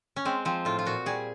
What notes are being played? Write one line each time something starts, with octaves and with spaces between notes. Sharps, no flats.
C#4
G#3 C4
F3 C4
A2 F4
F4
A#2 F#4
G3 G#4